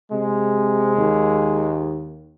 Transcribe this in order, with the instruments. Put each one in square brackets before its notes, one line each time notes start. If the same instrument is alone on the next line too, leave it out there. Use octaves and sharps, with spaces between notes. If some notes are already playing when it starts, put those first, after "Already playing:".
[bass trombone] C3 [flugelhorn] G#3
[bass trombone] D#2